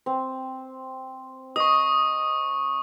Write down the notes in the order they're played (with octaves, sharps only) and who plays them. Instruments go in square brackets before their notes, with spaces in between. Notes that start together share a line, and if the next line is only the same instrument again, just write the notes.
[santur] C4
[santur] D#5 [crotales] C#6 D#6